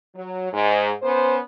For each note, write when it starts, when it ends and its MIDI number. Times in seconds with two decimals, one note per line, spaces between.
0.16 0.51 54
0.53 0.91 44
1.03 1.38 59
1.03 1.38 61
1.03 1.38 72